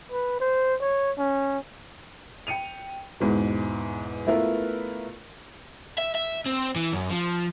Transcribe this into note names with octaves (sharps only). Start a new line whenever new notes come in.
B4
C5
C#5
C#4
G5 C#7 D#7 F7
E2 G#2 B2
A3 B3 E4 F4 A#4 B4
E5
E5
C4
E3
F#2
F3